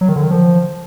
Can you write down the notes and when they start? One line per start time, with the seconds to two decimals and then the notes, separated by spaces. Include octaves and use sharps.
0.01 F#3
0.08 D#3
0.16 D3
0.23 D#3
0.31 F3